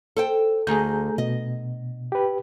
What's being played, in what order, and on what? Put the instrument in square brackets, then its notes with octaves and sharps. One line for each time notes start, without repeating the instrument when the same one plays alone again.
[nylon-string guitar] A4 C5 G5
[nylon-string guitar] D2 [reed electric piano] G#4 A#5 G6
[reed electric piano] B2 [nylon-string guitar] D#5
[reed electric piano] G4 B4